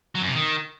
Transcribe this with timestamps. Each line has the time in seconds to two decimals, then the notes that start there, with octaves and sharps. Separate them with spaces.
0.15 F#3
0.22 F#2
0.28 C3
0.35 D#3